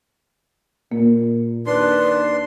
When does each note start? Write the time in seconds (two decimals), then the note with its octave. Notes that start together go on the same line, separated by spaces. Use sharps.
0.92 A#2 A#3
1.66 D#2 D4 B4 C6